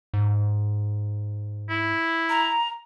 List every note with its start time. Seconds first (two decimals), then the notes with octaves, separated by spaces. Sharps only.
0.14 G#2
1.70 E4
2.30 A#5